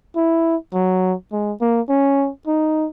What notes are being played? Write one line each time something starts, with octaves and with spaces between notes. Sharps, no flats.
E4
F#3
G#3
A#3
C#4
D#4